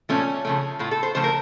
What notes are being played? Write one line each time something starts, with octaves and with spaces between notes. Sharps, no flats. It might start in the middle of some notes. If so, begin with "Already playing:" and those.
A#2 F3 A3 C#4
C#3 F3 A3
A2 A3 F4
A4
C5
C#3 F3 A3 C5
A#4